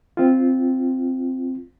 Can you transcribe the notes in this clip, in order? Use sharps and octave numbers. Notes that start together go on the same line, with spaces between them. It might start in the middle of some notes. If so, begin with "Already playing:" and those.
C4 F4